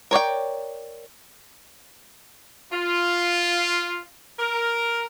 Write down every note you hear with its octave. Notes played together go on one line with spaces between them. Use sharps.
A#4 C#5 D5 G5
F4
A#4